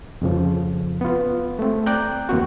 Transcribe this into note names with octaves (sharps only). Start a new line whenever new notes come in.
F2 C#3 F3
B3 F4
A3 C4
D5 G5 A#5 F#6 G6
E2 A#3 C4 F#4